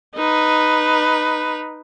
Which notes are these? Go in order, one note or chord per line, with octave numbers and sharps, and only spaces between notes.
D#4 B4